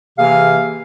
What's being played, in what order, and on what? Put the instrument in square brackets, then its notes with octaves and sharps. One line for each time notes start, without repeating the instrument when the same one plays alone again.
[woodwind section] C3 E3 A#3 G#4 F5